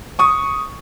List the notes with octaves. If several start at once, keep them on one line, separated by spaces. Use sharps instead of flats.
C#6 D#6